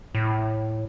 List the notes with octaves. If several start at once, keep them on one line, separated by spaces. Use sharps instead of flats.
A2